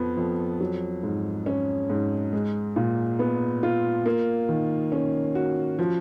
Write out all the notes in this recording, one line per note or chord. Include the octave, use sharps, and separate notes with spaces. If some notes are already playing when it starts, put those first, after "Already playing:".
Already playing: F2 F3 B3
F2
F#3
G#2
C#4
G#2
G#3
A#2
B3
F4
A#3
D#3
C#4
F#4
F3